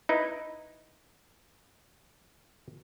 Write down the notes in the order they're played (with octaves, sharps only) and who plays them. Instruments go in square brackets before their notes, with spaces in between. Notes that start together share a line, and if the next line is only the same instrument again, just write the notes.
[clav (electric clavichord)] D#4 E4 B4